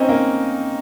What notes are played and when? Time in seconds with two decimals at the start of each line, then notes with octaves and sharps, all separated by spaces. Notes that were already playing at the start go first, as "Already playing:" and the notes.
Already playing: C4 C#4 D#4
0.09 A#3